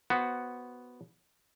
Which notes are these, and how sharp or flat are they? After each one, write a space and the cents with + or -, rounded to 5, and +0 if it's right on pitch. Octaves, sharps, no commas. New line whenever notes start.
B3 +0 F#4 +0 C5 +10